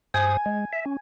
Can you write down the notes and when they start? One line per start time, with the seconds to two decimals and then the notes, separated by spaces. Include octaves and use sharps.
0.14 G2 C5 G#5 D#6
0.46 G#3
0.73 E5
0.86 C#4